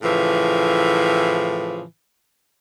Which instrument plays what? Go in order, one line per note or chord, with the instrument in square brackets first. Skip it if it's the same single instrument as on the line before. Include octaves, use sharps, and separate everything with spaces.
[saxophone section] A2 C#3 E3 F3